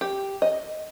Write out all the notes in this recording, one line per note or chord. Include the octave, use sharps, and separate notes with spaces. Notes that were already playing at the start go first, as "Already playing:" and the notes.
G4
D#5